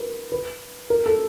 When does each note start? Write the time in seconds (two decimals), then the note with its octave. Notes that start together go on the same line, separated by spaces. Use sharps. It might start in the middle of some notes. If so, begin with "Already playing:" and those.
Already playing: A#4 B4
0.32 B4
0.90 A#4
1.06 A4